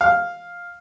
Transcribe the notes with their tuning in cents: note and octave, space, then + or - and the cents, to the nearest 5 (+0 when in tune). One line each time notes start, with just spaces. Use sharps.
F5 +5